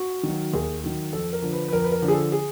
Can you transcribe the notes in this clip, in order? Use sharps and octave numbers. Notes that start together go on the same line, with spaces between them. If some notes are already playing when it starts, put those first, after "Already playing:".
Already playing: F#4
D#3 F#3
D#2 G#4
D#3 F#3
F2 A4
A#4
D3 F3
B4
B4
F2 A#4
B4
A#4
D3 F3
G#4
A4
G#4